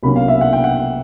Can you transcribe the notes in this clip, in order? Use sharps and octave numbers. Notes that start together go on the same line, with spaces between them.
C2 B2 F#3 A#3 C#4 B5
F5
E5
F#5
G5
F#5